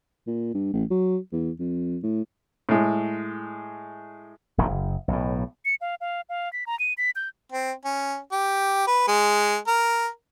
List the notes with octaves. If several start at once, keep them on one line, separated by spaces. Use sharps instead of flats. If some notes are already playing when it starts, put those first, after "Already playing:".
A#2
G2
A1
F#3
E2
F2
A2
A2 G#3
D#1 A#1 G#2 D#3
F#1
B1 A2
C#7
F5
F5
F5
B6
A#5
D#7
B6
G6
C4
C#4
G4
B4
G#3
A#4